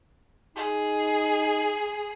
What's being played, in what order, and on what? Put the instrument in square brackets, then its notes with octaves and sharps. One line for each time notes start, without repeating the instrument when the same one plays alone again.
[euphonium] D#4 [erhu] G#4